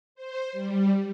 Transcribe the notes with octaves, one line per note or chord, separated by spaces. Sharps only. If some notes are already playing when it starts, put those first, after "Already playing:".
C5
G3